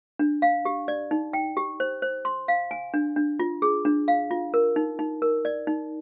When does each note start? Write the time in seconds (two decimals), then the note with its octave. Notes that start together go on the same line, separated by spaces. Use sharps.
0.19 D4
0.42 F5
0.65 G4
0.88 D5
1.11 D#4
1.33 G5
1.57 G4
1.80 C5
2.02 C5
2.25 C6
2.48 F5
2.71 G#5
2.94 D4
3.16 D4
3.40 F4
3.62 G#4
3.85 D4
4.08 F5
4.31 F4
4.54 A#4
4.76 D#4
4.99 D#4
5.22 A#4
5.45 D5
5.67 D#4